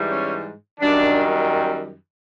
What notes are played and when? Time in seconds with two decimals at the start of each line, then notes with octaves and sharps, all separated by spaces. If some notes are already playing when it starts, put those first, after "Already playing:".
Already playing: G#2 E3 G3
0.09 C#4
0.80 F#2 D#3 G3 D4